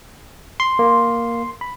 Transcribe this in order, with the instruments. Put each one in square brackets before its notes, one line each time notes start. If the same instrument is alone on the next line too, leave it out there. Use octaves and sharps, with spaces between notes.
[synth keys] C6
[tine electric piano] A#3
B5